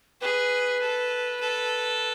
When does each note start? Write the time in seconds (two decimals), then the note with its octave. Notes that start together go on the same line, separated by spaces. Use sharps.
0.21 G#4 B4
0.82 A4
1.41 A4